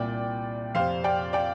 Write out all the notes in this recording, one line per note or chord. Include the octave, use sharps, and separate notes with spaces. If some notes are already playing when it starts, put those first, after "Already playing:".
Already playing: C2 A#2 D5 G5
F2 C3 C5 F5
D5 G5
D5 G5